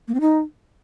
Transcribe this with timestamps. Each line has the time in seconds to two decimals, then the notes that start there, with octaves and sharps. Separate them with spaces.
0.08 A#3
0.14 C4
0.21 D#4